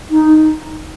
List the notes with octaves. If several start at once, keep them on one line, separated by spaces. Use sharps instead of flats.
D#4